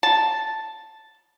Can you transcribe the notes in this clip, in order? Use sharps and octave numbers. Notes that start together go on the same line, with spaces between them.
A5